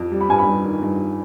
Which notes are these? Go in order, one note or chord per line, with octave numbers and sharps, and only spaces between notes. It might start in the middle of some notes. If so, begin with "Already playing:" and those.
Already playing: F2
G3
B5
G2 G#5
B5
G2
D#3
G2